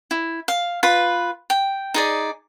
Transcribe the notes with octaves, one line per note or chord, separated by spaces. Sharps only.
E4
F5
F4 B4 B5
G5
D#4 G#4 D5